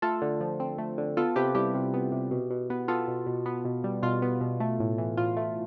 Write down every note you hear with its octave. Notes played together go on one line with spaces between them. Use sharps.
A3 F4 A4
D3
F3
C4
A3
D3
B3 F4 A4
C3 G4 B4
G3 E4 G4
C3
B3
C3
B2
B2
B3
B3 F4 A4
B2
B2
B3
B2
G3
B2 F4
B3
B2
A3
A2
E3
A2 F4
A3